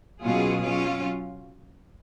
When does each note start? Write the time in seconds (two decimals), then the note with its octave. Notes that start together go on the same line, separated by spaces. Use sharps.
0.21 B2 F#3 C#4 F4 G#4
0.62 F#3 C#4 F4